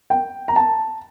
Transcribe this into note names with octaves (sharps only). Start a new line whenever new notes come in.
G5
A#5
A5